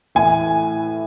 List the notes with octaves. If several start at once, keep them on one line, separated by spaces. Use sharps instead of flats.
A2 E3 G#5